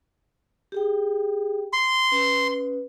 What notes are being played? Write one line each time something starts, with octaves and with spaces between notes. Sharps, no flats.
G4 G#4 G5
C6
C#4 B4